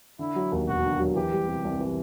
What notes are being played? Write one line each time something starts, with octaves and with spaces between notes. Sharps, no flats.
D3 E4
F#3
D#2
E1 F#4
D3
F#3
E3 G4
G3
C3
C2
E3